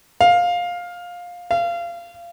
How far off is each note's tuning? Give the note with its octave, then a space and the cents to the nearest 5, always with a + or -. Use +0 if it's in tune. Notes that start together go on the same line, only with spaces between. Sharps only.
F5 +15
F5 -25